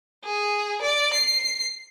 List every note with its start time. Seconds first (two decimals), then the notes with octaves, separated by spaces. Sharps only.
0.24 G#4
0.81 D5
1.13 C7